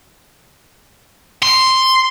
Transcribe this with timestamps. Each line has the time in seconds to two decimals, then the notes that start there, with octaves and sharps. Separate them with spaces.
1.43 C6